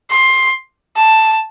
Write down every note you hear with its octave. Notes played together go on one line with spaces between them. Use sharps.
C6
A5